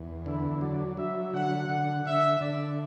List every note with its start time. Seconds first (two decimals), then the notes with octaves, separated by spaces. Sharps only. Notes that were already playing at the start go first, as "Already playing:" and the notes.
Already playing: E2
0.26 D3 E4
0.61 F#3 D5
0.97 F#3 E5
1.33 D3 F#5
1.69 D3 F#5
2.05 D3 E5
2.41 D3 D5